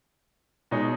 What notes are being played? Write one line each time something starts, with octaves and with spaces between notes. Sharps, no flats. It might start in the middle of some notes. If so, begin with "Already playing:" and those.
B2 G#3 D#4 G#4 C#5